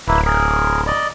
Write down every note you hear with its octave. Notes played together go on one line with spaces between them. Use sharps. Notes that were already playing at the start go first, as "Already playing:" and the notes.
D1 A#3 E4 B4
G#4 A#4
D5 D#5